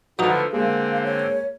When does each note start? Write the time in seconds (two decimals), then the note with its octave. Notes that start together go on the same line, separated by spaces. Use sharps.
0.19 D3 F3 F#3 A3 D#4 B4
0.53 D3 G#3 A#3 C4 F5
1.04 C#5